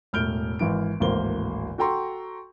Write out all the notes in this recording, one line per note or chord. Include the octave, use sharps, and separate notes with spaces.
E1 A2 F6 G6 D7 G7
G#1 E3 D7
D1 G#1 E3 A#3 C5 G7
F#4 A4 G5 A#5 C6 C#6